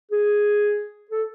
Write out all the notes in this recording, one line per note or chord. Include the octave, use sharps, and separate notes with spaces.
G#4
A4